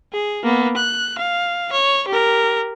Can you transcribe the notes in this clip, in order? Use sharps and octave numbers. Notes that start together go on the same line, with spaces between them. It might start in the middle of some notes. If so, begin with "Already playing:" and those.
G#4
A#3 B3
F#6
F5
C#5
G4 A#4